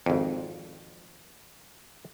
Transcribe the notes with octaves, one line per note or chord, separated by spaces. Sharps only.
G#1 F2